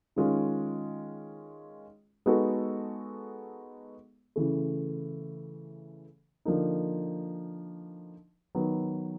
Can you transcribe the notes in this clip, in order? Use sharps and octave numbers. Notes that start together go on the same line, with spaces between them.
D#3 G#3 C#4 F4
G#3 B3 D#4 F#4 A4
C#3 E3 A3
D3 F3 A#3 D#4
D#3 F#3 B3